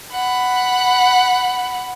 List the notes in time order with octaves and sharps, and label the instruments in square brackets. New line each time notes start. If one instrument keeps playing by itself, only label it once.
[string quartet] F#5 B5